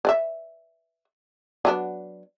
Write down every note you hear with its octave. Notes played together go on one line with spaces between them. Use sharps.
B4 D5 E5
F#3 B3 D4